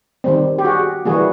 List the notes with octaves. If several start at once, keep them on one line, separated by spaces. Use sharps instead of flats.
D#3 G3 C4
G4
F#4 G#4
E3 G3 A#3 F#4 G#4